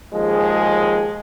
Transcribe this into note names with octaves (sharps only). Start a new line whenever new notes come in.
D#2 F3 G#3 G#4